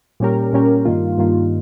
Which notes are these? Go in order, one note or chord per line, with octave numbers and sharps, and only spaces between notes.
A#2 G3 C#4 G4 A#4
A#2 G3 C#4 G4 A#4
G2 D#3 A#3 F4
G2 D#3 A#3 F4